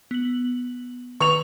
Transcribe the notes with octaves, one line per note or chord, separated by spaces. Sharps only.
B3 F#7
D#3 B4 A#5 C#6 F7